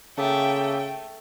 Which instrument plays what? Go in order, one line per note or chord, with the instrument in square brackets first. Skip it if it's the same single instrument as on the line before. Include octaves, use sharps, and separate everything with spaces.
[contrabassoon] C#3 [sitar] A3 [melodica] A#3 A4 E5 [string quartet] G5